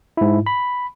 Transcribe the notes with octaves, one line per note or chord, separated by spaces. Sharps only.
G#2 E4
B5